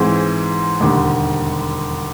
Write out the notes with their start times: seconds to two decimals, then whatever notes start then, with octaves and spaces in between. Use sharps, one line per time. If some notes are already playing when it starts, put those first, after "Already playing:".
Already playing: G#2 E3 G#3 C4
0.80 E1 D#2 D3 G3